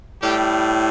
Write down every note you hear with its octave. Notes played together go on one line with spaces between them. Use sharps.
A2 G3 G4